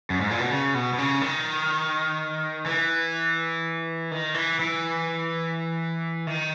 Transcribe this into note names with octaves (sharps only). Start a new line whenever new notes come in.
F#2
G#2
A#2
B2
C#3
B2
B2
C#3
D#3
E3
D#3
E3
E3
D#3